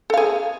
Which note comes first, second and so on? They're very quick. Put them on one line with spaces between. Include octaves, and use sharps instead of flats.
A4 F5 G#4